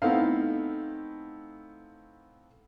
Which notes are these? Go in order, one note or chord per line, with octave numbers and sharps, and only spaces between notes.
A3 B3 C4 D#4 E4 F5